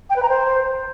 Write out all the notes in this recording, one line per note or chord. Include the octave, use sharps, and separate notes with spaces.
G5
B4
A#5
C5